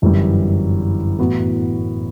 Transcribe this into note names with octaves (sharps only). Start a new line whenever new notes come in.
G1 F#2 E3 G3
A2 E3 B3 F#4